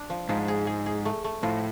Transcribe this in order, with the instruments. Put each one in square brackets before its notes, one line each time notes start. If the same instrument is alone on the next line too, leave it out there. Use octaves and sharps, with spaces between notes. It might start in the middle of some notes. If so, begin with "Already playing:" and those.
Already playing: [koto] D4
F3
[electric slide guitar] G#2 [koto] F3
[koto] G#4
G#4
G#4
A3
A3
[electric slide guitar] A2 [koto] F3